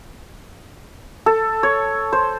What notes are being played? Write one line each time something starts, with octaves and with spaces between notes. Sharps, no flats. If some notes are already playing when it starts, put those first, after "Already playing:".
A4
C#5
C5